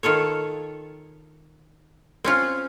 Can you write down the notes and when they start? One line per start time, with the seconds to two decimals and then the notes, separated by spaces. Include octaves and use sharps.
0.03 D#3 F4 A4 C#5
2.24 C4 C#4 F4